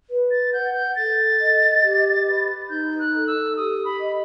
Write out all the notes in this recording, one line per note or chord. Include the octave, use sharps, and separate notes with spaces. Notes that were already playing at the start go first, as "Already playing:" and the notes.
B4
A6
F#5 G6
G6
A4 A6
D#5
G4
B4
D#4 G6
F#6
A4
E6
G4 D#6
B5
D#5